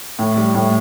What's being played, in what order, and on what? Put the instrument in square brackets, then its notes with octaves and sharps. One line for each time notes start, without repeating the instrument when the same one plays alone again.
[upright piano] A2
G3
A2